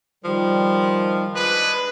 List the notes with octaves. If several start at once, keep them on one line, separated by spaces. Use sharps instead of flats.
D#3 F3 G3
G#3 D4 B4